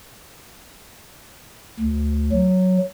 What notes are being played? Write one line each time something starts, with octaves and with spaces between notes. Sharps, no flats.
D2
F#3